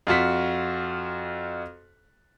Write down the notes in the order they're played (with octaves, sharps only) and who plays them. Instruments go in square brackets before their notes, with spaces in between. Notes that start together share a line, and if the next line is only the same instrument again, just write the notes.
[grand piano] F2 F4 F#4 B6